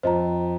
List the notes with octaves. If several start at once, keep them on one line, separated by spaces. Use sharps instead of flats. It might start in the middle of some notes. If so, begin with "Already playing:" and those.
F2 F3 C5 D#5 A#5